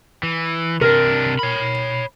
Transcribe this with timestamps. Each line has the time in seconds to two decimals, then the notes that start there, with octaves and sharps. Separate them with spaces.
0.23 E3
0.81 C3 D4 A#4
1.39 C#5 B5